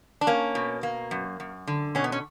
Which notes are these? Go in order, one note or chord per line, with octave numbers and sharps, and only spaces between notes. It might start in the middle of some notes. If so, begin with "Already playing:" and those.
D4
A#3 C#4
B2
A#3
F#2
F#2
D3
B2 C#4
B3
C#4